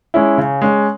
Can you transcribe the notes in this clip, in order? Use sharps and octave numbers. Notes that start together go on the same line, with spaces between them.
G#3 C#4 E4
C#3
G#3 C#4